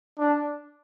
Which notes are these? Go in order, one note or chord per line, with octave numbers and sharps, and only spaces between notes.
D4